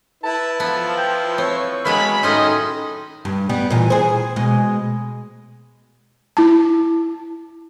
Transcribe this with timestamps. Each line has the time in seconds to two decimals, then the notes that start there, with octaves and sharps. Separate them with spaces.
0.24 E4 B4 A5
0.60 F3 B3 A5
0.97 G5
1.38 C4 C#5
1.85 F#3 G#3 A#3 B3 A5 B5
2.23 A2 D#3 C#4 D#4 D#5 C6
3.25 G2
3.49 G3 B3
3.70 A#2 E3
3.90 G#4 C5
4.36 B2 G#3
6.37 E4 A5